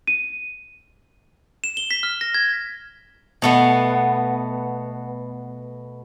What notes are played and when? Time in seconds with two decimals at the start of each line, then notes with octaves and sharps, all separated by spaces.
0.07 D#7
1.64 E7
1.77 G7
1.91 B6
2.03 F6
2.21 A#6
2.35 G#6
3.42 B2 A3 B3